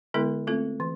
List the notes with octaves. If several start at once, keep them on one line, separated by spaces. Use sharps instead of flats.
D3 G#3 B3 E4 A4
A3 C4 F4 A4
E3